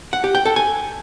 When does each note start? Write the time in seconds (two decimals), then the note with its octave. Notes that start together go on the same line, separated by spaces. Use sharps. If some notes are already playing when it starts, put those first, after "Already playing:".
0.13 F#5
0.24 G4
0.35 G5
0.45 A4
0.56 G#5